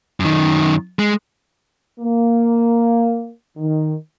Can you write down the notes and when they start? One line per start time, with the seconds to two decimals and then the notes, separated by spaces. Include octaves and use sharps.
0.20 F#2 D#3
0.99 G#3
1.99 A#3
3.57 D#3